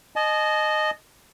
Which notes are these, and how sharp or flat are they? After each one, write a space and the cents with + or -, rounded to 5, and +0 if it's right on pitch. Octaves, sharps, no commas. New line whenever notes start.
D#5 -15 A5 -40